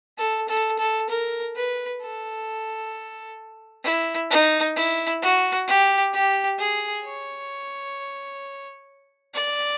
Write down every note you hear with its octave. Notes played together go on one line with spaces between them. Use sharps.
A4
A4
A4
A#4
B4
A4
E4
D#4
E4
F#4
G4
G4
G#4
C#5
D5